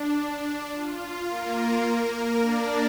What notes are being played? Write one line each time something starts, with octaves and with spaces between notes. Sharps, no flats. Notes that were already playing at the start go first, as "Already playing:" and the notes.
Already playing: D4
F4
A#3 A#4
D4 D5